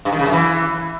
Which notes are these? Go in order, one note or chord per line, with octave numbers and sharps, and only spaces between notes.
G2
D#3
C#3
F#2
E3